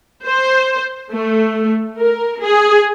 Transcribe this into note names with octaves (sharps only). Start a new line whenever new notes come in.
C5
A3
A#4
G#4